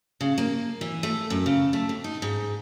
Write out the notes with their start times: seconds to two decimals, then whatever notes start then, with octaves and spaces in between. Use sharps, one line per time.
0.21 C#3
0.38 A#3
0.81 E3
1.03 A3
1.30 F#2
1.46 C#3
1.73 A3
1.89 F2
2.04 D#4
2.22 G#2